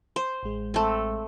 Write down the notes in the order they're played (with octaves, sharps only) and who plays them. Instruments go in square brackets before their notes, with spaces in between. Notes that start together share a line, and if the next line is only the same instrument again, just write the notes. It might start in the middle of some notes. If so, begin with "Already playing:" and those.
[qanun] C5
[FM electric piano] A1 G#3
[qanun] A3 C4